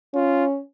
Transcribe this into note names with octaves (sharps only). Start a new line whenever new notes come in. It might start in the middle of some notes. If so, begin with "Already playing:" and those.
C#4 F4